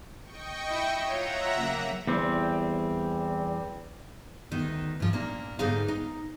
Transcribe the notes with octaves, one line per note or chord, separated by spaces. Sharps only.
D#5 G5 C#6
E4
F4 C#5 E5 F#5 A#5
C#3 F#3 A#3
E2 G3 C4
D2 D#3 B3
G#2 F3
A#2 A#3 D4
G#2 D3 B3 D#4 G#4 F5
D#4